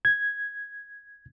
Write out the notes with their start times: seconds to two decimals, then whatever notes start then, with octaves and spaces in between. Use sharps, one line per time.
0.05 G#6